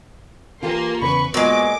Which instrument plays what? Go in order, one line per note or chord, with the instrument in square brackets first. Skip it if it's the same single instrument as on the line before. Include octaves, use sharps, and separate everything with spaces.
[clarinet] E3 [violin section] A#3 C6 [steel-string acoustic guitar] F4 G4 A4
[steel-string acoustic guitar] E2 C#3 [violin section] B4 C#6 [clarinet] B5
[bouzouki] A#2 G#3 [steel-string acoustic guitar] B3 [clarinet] F#4 [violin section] D6